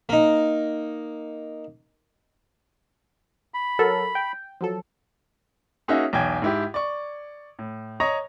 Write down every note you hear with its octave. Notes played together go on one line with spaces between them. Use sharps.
A#3 D#4
B5
F#3 A4 A#4
G5
F3 F#3 A4
A#3 C#4 D#4 F#4 G#4 E5
B1 E2 G5 G#5 G#6
G#2 E4 G4
D5 C#6
A2
C#5 D#5 A#5 C#6 A#6